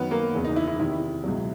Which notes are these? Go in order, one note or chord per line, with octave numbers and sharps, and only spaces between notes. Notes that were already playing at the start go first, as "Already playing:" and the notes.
Already playing: F#2 D#3 F#3 B3 B4
A#3 A#4
E2 C#3 E3
D#4
E4
E4
E2 C3 D#3 E4
C#2 B2 F#3